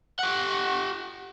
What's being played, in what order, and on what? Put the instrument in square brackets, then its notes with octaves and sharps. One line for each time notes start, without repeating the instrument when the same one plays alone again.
[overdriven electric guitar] G4 F#5